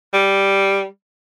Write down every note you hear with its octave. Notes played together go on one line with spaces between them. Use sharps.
G3